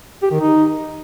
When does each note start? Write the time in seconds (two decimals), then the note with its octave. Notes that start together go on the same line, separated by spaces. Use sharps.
0.23 G4
0.31 D#3
0.40 D#4